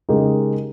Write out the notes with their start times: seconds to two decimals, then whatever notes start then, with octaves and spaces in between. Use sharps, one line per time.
0.09 C#3 G#3 D#4 G4 A#4